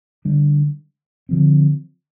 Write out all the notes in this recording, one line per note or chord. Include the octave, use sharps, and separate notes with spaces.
D3 G3 D4
D3 F3 C4